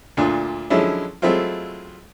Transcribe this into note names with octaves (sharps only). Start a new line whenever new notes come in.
D2 A#2 D4 F4
D3 F3 F#3 G#3 C#4 E4
F#3 G#3 A3 C4 E4 F4